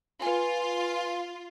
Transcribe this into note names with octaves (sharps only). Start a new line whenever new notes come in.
F4 B4 G#5